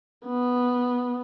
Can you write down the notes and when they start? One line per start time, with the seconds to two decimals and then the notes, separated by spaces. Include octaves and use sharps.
0.26 B3